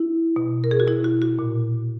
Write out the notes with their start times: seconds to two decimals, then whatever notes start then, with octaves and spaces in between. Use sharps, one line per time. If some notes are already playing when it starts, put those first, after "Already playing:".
Already playing: E4
0.36 B2
0.64 A#4
0.71 G#4
0.80 F#4
0.87 B2 E4
1.04 F#4
1.22 F#4
1.39 A#2